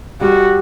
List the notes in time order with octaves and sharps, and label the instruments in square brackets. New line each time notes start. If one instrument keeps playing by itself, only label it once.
[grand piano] G3 [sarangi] F#4